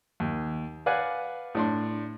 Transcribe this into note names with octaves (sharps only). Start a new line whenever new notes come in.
D#2
B4 D5 F5 F#5 G#5
A2 D4 C6